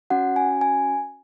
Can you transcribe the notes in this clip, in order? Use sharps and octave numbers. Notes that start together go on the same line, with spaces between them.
C#4 F#4 F#5
G#5
G#5